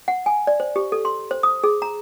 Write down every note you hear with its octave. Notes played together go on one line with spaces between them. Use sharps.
F#5
G#5
D5
C5
G4
A4
C6
C5
D#6
G#4
A#5